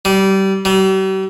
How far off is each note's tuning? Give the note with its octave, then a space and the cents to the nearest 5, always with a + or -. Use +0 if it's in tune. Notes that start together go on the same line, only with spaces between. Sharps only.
G3 -25
G3 -45